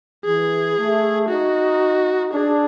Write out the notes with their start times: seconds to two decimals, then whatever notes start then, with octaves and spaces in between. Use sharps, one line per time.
0.25 E3 G#4
0.77 A3
1.29 D#4 F#4
2.33 D4 G#4